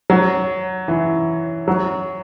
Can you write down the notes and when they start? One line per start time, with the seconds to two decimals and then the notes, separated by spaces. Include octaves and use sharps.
0.10 F#3
0.88 E3
1.68 F#3